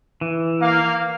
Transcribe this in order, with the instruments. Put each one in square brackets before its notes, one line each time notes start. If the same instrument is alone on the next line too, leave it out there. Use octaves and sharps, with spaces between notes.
[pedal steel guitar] E3
[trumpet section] A#3 F5